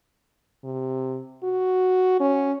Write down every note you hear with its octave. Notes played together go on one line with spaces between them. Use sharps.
C3
F#4
C#4